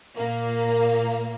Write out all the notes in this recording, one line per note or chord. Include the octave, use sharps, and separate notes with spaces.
A#2 A#3